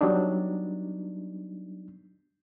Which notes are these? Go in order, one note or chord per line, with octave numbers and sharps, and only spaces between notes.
F#3 G3 B3 D4 D#4